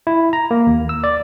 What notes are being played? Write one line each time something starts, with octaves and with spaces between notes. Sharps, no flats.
E4
A#5
A#3
D#2
E6
D5